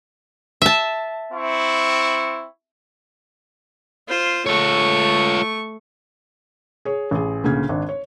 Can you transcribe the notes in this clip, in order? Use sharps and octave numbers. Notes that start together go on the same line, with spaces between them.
E5 A5
C4 E4 C#6
F4 C5
A3 F4 C#5 C#6
G#4 C#5
A1 G#4
D2 A#2 C#3 G#6
G#1 D4
C#5